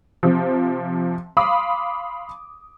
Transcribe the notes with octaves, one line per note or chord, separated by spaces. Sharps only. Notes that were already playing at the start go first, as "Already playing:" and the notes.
C3 F3
F5 B5 C6 D6 D#6